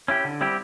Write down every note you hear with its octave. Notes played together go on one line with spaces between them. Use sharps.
C#4 E4 G4
D3
G3 C4 E4 G4